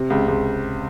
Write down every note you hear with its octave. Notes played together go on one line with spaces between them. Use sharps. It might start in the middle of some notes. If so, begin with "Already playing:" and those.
Already playing: C3
C#2
C#2